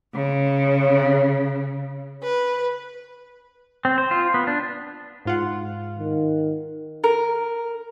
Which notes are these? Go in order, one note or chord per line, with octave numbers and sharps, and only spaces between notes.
C#3
B4
C4
C5
F4
B3
D4
G#2 F4 F#5
D#3
A#4